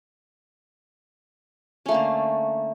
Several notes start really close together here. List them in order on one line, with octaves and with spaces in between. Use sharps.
C#4 A3 A#3 D3